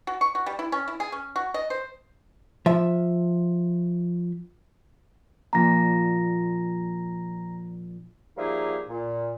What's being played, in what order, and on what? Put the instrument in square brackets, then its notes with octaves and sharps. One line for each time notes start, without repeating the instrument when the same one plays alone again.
[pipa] F#4
C#6
F#4
G3
E4
C#4
E4
G#4
C#4
F#4
D#5
C5
[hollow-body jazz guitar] F3 E5
[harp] A#2 F3 D4 [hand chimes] A#5 A#6
[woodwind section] F3 G3 A#3 D#4 G#4 E5
A#2